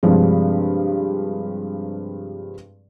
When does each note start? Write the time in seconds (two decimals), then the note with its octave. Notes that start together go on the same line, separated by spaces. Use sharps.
0.03 G2 C3 F3 G#3